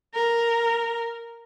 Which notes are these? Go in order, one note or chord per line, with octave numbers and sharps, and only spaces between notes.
A#4